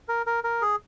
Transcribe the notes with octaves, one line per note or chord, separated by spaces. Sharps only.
A#4
A#4
A#4
G#4